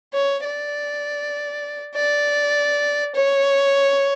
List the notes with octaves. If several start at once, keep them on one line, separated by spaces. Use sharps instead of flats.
C#5
D5
D5
C#5